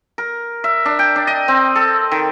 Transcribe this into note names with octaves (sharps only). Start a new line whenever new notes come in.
A#4
E5
D4
G5
D4
D#5
C4
A4
D#3